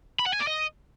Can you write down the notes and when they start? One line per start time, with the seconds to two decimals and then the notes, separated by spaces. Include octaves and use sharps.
0.19 B5
0.26 F#5
0.33 G#5
0.40 D5
0.47 D#5